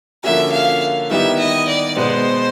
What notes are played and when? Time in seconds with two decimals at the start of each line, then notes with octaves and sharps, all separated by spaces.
0.23 D3 F3 A#3 C#4 F#4 E5
0.52 F5
1.10 D#3 G3 B3 E4 G4 E5
1.39 D#5
1.68 D5
1.97 B2 G#3 B3 C5